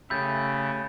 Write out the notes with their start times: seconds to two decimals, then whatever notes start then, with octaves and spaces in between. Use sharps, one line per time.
0.10 C#3 A3 G4 E5 B5 G6 A6